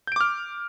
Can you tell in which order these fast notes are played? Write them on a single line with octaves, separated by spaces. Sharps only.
G6 D7 D6 F6